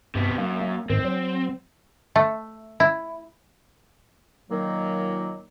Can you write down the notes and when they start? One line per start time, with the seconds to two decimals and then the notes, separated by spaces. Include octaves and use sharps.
0.15 G2 C3 B3
0.38 F#2 A#3
0.61 A#3
0.90 G#2 D#3 C4
1.05 F#3
2.16 A3
2.80 E4
4.51 A#2 D#3 F#3 A#3